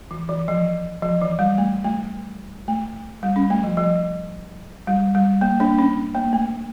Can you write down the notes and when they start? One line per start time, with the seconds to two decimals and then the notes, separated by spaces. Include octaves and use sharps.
0.11 E3
0.29 E3
0.48 F3
1.02 F3
1.21 E3
1.39 G3
1.58 A3
1.84 A3
2.68 A3
3.23 G3
3.36 C#4
3.50 A3
3.64 F3
3.77 F3
4.87 G3
5.15 G3
5.41 A#3
5.60 A#3 D4
5.79 C#4
6.15 A#3
6.33 A3